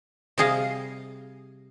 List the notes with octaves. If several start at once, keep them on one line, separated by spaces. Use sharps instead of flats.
C3 G3 G#4 D#5 F5